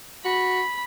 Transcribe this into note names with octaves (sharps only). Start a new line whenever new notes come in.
F#4 B5